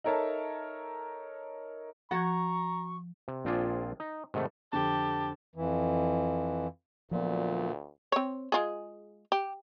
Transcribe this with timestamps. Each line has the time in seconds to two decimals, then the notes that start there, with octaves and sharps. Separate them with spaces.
0.04 D#4 A4 A#4 C#5 E5 A5
2.11 F3 F#4 F#5 A#5 C#6 G#6
3.28 C3
3.45 A#1 C4 D4 F4 G#4 D5
4.00 D#4
4.34 G#2 C3 D#3 A3
4.73 F2 D3 G4 A5
5.56 F2 E3
7.11 D2 A#2 F3 F#3 B3
8.12 C4 C#5
8.52 G#3 F4 G#4
9.32 G4